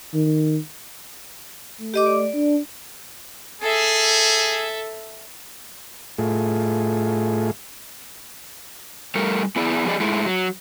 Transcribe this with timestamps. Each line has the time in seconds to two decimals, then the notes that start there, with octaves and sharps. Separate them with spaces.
0.14 D#3
1.78 A3
1.94 G4 D#5 D6
2.06 D5
2.33 D4
3.61 G#4 A4 E5
6.18 A2 A3 F4 G#4
9.15 A2 G3 A4 A#4
9.56 B3 E4 G#4 D5
9.86 F3 G3 G#4 D5 D#5
10.00 G#2 G#3 A3 E4
10.26 F#3